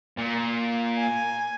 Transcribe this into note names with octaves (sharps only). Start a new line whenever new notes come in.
A#2
G#5